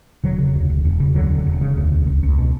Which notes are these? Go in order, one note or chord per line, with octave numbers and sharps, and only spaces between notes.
E1 D3 F#3
C#3
D2
E1
E1
C#3
D2 D3 F#3
E1
E1
C#3
D2
E1
C#2
C#2
B2